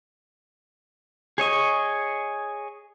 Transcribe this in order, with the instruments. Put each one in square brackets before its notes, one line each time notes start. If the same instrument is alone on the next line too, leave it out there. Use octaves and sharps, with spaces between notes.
[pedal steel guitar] G#4 C#5 D#5 C#6